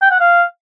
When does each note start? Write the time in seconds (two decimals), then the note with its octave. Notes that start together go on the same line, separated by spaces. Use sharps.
0.02 G5
0.11 F#5
0.20 F5